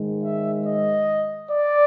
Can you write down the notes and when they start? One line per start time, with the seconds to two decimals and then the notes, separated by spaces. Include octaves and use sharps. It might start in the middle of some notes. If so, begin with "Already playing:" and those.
Already playing: G#2 D#3 G#3
0.22 E5
0.65 D#5
1.50 D5